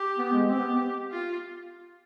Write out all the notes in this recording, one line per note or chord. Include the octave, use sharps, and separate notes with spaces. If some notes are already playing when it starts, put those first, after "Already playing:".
Already playing: G4
B3
G#3
C4 G4
B3
F4